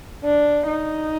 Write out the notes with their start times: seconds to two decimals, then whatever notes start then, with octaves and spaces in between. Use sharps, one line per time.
0.24 D4
0.67 D#4